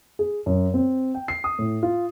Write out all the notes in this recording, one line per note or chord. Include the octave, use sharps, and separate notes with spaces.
G#4
F#2
C4
G5
C7
D#6
A2
F4